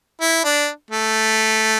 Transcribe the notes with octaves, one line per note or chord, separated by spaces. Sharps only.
E4
D4
A3